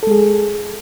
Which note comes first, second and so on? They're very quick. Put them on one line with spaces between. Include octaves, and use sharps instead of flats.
A4 G#3 G#4